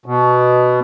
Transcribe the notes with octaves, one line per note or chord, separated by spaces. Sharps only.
B2